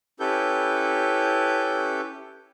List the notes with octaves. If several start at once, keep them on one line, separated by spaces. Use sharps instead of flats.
C#4 E4 G4 A4 B4 G6